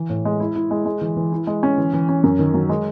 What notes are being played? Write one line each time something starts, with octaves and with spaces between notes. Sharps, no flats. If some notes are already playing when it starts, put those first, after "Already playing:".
Already playing: E3
A2
G#3
E4
E4
G#3
G#3
E3
E3
E4
G#3
C#4
E3
E3
C#4
F#2
D#3
F#3
G#3